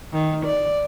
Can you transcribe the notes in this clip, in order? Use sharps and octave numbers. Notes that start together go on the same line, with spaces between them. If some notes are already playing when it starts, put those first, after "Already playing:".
D#3
D5